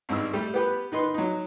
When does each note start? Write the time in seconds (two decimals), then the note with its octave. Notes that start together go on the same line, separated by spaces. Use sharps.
0.09 G#1 G2 D#4 E6
0.33 G3 A3 G4
0.54 B3 G4 B4
0.92 D#3 D#4 B4 C6
1.14 F#3 D#4